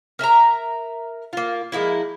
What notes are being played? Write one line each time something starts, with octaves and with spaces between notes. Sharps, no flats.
A#4 E5 A5 A#5
A#3 F4
F3 G#3 A#3 E4